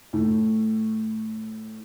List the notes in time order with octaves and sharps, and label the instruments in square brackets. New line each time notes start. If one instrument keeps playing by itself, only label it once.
[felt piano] A2 A3